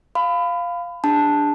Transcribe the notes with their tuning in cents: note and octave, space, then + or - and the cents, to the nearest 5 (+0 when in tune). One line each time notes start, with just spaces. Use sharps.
F5 +0 B5 +25
D4 +0 G#4 -45 A5 +0